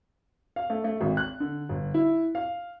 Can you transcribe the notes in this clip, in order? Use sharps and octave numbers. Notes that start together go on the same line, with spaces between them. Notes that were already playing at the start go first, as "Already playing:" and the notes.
F5
A3
A3
G#1
F#6
D3
G1
E4
F5